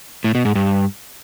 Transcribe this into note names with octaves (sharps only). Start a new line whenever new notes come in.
A2
B2
G#2
G2